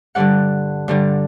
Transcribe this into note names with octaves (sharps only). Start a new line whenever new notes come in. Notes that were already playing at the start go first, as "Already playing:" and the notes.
G2 D3 G3 D5 F#5
G2 D3 G3